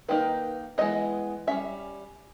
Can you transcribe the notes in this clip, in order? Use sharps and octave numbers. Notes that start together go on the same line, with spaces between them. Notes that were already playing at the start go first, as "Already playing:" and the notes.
D#3 A#3 D#4 B4
E3 G#3 B3 D#4 D#5
G3 C#4 E5